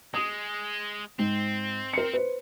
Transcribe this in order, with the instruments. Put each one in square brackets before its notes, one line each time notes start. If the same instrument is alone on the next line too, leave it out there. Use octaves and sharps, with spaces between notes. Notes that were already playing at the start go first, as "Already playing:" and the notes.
[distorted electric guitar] G#3 [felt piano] D#6
[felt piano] G#2 [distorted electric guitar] C4
[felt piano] A#4 C#7
B4 C5